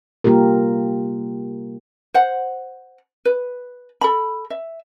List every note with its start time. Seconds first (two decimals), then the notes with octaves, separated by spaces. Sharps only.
0.24 C3 G3 A#3 F4 G4 A#4
2.14 C5 F#5
3.25 B4
4.01 A4 B5
4.50 E5